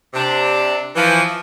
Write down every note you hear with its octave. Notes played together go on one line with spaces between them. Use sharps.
C3 D4
E3 F3